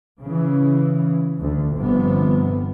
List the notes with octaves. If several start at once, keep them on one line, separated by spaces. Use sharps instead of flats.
C#3 E3
D2
G1 C3 F3 B3